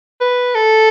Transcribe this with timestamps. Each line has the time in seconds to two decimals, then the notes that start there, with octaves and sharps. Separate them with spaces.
0.20 B4
0.55 A4